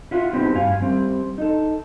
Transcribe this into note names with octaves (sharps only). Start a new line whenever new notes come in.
E4 F4 F#5
B3 C4 D#4 F#4 G4
G2 F5 G#5
G3 C4
D#4 A4